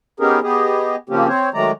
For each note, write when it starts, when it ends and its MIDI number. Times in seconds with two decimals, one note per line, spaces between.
0.20 0.40 59
0.20 0.40 61
0.20 0.40 63
0.20 0.40 67
0.20 0.40 68
0.20 0.40 70
0.43 0.96 59
0.43 0.96 67
0.43 0.96 68
0.43 0.96 75
1.09 1.28 49
1.09 1.28 53
1.09 1.28 58
1.09 1.28 60
1.09 1.28 61
1.09 1.28 67
1.28 1.49 60
1.28 1.49 72
1.28 1.49 73
1.54 1.71 51
1.54 1.71 54
1.54 1.71 56
1.54 1.71 57
1.54 1.71 74
1.54 1.71 82